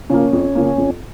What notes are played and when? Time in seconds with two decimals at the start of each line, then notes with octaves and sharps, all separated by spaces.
0.10 C#3 F3 A#3 C#4
0.33 F2
0.55 C#3 F3 A#3
0.78 F2